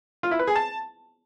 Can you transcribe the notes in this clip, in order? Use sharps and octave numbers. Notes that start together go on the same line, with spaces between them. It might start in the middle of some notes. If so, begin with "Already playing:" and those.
F4
E4
B4
G#4
A5